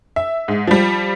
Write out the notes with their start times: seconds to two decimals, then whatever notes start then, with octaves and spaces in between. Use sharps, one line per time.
0.16 E5
0.48 G#2
0.68 F3 G3